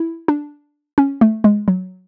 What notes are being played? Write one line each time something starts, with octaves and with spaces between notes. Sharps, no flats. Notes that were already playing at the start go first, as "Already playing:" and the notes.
Already playing: E4
D4
C#4
A3
G#3
F#3